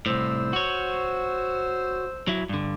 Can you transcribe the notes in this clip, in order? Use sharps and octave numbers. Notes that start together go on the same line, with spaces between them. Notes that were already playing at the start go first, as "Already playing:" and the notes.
C2 A2 C5 E6
F#4 C#5
F#3 E4
G2 D3